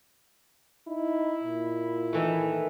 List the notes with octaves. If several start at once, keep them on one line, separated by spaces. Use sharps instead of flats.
D#4 E4
A#2
D#3 E3 A3